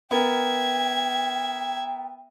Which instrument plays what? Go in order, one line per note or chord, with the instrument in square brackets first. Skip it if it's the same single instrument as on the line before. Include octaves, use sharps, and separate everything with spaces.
[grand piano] B3 A#4 [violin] E5 G#6 [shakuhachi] G5